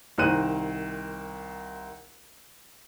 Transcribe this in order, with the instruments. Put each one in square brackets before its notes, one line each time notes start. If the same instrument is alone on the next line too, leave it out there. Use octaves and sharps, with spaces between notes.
[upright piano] C2 D#3 A#4 C5 F#6 D#7